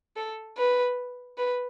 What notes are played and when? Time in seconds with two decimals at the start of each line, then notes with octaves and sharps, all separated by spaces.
0.16 A4
0.58 B4
1.38 B4